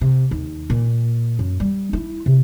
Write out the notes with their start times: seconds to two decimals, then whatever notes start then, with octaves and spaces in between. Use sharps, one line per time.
0.01 C3
0.31 D#2
0.70 A#2
1.39 F#2
1.60 G3
1.93 E4
2.26 C3